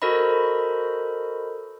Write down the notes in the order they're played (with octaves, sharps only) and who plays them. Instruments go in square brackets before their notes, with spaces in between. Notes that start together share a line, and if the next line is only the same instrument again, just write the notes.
[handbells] F#4 A4 A#4 C5 D#5 B5